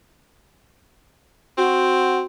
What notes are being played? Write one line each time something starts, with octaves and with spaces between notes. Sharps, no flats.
C4 F#4